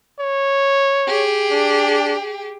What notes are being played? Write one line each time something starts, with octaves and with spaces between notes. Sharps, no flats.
C#5
G4 G#4
D4